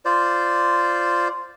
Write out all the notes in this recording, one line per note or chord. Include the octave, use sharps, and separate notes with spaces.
F4 C5 D5